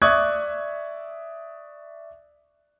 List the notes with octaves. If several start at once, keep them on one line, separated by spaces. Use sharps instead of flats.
D5 E5 C#6 D#6 F#6 G#6